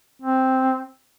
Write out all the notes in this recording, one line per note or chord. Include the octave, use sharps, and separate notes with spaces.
C4